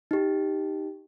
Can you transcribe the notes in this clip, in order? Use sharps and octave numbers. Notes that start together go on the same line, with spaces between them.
D#4 G4